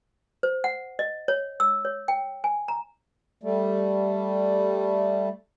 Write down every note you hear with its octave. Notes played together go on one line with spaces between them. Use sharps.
C5
F#5
D#5
C#5
E6
C#5
G5
G#5
A#5
G3 A3